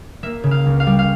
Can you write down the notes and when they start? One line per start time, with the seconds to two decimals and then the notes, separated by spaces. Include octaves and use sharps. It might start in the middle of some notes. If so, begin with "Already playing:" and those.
0.23 A#3 E5
0.44 C#3
0.51 F5
0.66 C#2
0.80 F5
0.87 G3
0.99 F5